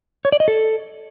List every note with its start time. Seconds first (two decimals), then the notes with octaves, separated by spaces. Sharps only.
0.25 C#5
0.32 D5
0.40 D#5
0.48 A4